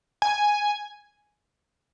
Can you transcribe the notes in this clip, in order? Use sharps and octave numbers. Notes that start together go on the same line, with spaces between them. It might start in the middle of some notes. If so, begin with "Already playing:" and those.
G#5